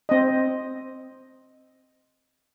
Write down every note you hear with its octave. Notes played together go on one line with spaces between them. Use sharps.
C4 D#5